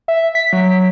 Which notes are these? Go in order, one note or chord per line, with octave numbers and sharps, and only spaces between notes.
E5
B6
F#3